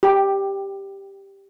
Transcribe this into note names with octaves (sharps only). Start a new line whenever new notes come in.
G4